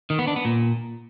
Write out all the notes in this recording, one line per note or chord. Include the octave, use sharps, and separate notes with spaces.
D#3
B3
D4
B3
A#2